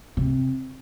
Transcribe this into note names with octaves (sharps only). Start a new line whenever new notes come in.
C3